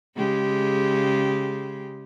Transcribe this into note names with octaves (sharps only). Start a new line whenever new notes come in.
C#3 G#3 G4